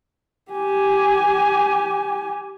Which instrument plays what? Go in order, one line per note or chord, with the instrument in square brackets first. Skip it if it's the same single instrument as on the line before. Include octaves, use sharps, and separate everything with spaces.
[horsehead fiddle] G4 G#5